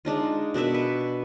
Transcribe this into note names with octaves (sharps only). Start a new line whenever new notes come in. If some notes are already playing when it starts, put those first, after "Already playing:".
G#3 D4 D#4 F4
B2 D4 A#4 E5
B4